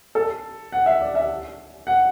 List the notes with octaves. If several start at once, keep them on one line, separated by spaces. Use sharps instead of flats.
A4
F#5
E5
D5
E5
F#5